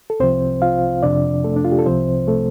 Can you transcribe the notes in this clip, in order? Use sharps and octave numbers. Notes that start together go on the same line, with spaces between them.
A4
C2 C3 F3 C4 C5
F4 F5
F2 C3 F3 D4 D5
A3 A4
D4
F4
G4
A4
C2 C3 F3 C4 C5
A3 A4